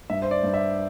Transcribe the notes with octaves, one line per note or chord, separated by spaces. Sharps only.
G2 E5
C5
D5
G2
E5